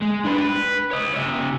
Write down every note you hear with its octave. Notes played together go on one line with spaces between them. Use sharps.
G#3
D4 B4
B4
C#5 D#5
C#3 E5